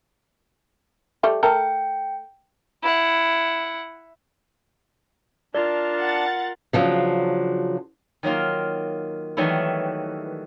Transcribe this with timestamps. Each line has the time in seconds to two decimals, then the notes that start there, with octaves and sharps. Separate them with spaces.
1.23 G3 A3 G4
1.43 A3 A4 A#4 G5
2.83 E4 F#5
5.55 D4 F4 A#4 D5 A5
6.00 F#5 A6
6.73 C#3 F3 F#3 D4
8.23 D#3 F#3 A#3 F4
9.37 D#3 E3 F#3 G3 A3 E4